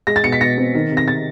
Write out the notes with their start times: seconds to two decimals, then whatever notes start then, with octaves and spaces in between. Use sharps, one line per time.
0.07 G#3 A#6
0.16 A6
0.24 B2 C#7
0.32 B6
0.41 B2 A#6
0.58 C4
0.74 D#3
0.91 C3
0.97 A#6
1.08 C3 A6